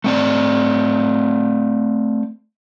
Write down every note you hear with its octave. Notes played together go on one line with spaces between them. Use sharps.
A3 C4 D5